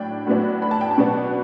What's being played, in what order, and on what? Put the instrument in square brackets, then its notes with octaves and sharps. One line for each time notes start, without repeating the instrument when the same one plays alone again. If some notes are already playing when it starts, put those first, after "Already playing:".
Already playing: [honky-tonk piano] A2 F#3 D4 G5
A2 F#3 B3 D4
B5
A5
G5
A5
B2 F#3 B3 D4